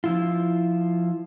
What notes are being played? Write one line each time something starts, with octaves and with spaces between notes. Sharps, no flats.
F3 E4 F4